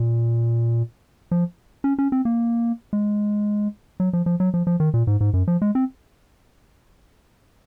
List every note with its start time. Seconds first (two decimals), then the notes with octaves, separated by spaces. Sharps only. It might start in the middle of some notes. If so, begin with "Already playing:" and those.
Already playing: A#2
1.31 F3
1.84 C#4
1.99 C#4
2.12 C4
2.25 A#3
2.93 G#3
4.00 F#3
4.13 F3
4.26 F3
4.40 F#3
4.54 F3
4.67 F3
4.80 D#3
4.94 A#2
5.07 G#2
5.21 G#2
5.34 F#2
5.48 F3
5.62 G#3
5.75 C4